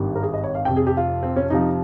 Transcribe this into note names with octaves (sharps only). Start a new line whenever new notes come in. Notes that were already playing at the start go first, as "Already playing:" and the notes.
Already playing: G#1 G2 D#3 G3
A#4
G#4
D#5
C#5
F5
F1 F2 C3 G5
G#4
G4
F4
C4
C#4
F2 C3 F3 D#4